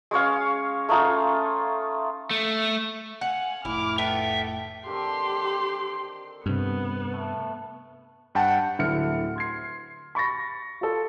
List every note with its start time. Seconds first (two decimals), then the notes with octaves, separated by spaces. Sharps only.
0.11 G#3 C#4 C#5 F5
0.89 A3 C#4 D#4 F4
2.31 A3
3.21 F5 F#5 G#5
3.65 F1 A2 E4 D6 F6
3.99 A3 B3 E5 G5
4.86 D3 D#3 C4 G4 C6
6.46 G2 C3 B3 D#5
7.13 A3
8.35 G2 F#5 G5 A5
8.79 D1 D3 E4 F6 C#7
9.36 C6 G#6 C7
10.15 B5 C#6 A6 A#6
10.81 F4 A4